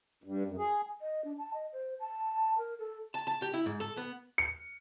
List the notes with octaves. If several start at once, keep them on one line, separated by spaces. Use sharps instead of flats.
G2
F#2
G#4
D#5
D4
A5
D#5
C5
A5
A#4
A4
A5
A5
G4
E4
G#2
A4
B3
C#7